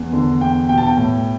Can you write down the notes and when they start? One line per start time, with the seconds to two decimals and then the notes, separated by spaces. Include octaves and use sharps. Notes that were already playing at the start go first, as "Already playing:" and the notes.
Already playing: E2
0.13 D3
0.41 E2 G5
0.69 B2 G5
0.78 A5
0.87 G5
0.97 A2